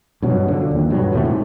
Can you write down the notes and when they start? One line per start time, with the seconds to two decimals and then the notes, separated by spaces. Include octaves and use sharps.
0.22 G2 B2 F#3
0.48 D3 F3
0.71 D#2
0.90 G2 B2 F#3
1.12 D#2 A2 C3 A3
1.25 G#2